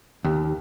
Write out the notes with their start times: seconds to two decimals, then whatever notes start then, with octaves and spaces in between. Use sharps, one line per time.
0.24 D#2